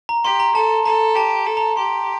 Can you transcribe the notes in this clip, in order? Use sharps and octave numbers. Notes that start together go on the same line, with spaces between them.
A#5
G4 C6
A#5
A4 A5
A4 A#5
G4 A5
A4
A#5
G4 C6